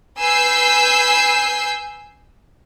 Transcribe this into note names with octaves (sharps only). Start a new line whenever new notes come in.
B4 G#5 E6 G6 C7